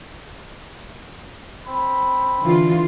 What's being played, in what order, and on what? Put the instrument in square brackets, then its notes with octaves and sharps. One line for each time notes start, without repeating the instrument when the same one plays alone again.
[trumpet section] C4 B5
[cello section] D3 E3 F4